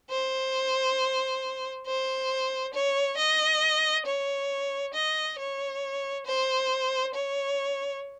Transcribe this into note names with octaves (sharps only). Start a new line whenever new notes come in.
C5
C5
C#5
D#5
C#5
D#5
C#5
C5
C#5